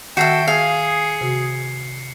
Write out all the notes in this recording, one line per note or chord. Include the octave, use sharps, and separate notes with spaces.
D#3 F#4 A4 E5 G5 C7 C#7
G#4 F5
C3 F#4 D#6